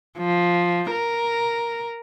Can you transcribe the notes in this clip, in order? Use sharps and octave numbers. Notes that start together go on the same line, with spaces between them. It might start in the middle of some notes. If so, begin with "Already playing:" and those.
F3
A#4